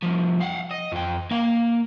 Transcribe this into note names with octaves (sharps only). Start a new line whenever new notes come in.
C2 F3
F5 F#5
D#5
F2 G5
A#3 F5